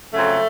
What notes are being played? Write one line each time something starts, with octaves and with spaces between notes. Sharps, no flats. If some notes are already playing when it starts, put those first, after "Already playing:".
F2 C#3 F#3 A3